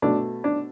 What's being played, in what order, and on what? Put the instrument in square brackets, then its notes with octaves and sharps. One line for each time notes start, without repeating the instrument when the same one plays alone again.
[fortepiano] B2 A3 D4
D4